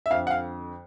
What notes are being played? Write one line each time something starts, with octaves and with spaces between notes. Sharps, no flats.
E5
F2 D3 F5
F#5
F5